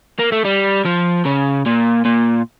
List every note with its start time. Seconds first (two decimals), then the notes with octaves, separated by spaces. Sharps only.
0.19 A#3
0.32 A3
0.45 G3
0.85 F3
1.25 C#3
1.66 A#2
2.05 A#2